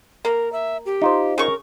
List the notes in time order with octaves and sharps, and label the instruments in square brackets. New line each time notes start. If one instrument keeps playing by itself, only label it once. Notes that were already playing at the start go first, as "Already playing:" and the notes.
[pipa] A#3 [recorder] A#4
[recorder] E5
G4
[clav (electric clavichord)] D#4 F4 C5
[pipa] C#3 C#6 [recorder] A#4